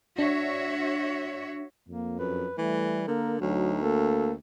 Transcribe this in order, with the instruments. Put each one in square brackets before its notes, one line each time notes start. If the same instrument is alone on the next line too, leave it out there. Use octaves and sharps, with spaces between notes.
[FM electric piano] D4 [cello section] F#4 C#5 E5
[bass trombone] F2 [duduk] A#3
[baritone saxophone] F#2 [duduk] B4
[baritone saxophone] E3 [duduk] G3 [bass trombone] A3
[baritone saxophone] D3 [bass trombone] A#3 [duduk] A#4
[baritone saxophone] D2 [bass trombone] F#3 [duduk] D#4
[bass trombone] A#3 [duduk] A4